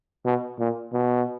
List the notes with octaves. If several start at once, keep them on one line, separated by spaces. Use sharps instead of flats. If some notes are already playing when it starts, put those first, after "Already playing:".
B2
A#2
B2